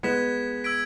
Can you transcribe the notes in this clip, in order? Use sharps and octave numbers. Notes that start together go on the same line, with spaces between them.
G#3 B3 G#6 B6 E7
E6 G#6 B6 D7